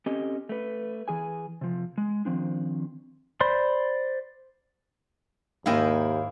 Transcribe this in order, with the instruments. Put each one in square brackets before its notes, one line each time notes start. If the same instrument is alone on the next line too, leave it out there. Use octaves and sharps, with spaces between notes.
[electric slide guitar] C4 C#4 G4 A4 D#5
A3 B4
E3 G#4 G#5
C3 F3
G#3
D#3 F3 C4 D4
[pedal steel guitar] C5 D5 B5 C6
[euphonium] D#2 [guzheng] G#2 E4 D#5 [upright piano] A#3 [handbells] F5 G5